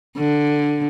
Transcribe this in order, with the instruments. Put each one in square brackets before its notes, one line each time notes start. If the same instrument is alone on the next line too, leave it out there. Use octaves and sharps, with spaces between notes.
[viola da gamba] D3